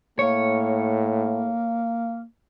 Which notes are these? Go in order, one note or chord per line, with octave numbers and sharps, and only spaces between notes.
A2 A#3 C#5